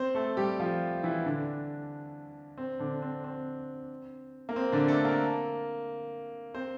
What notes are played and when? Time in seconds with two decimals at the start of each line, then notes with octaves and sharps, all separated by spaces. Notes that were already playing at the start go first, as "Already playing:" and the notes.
Already playing: C4 C5
0.15 A3 A4
0.37 G3 G4
0.60 F3 F4
1.03 E3 E4
1.25 D3 D4
2.58 C4
2.79 D3 D4
3.02 C4
3.24 C4
4.49 A#3
4.56 C4
4.72 D3 D4
4.88 A3 A4
5.05 A#3 A#4
6.55 C4 C5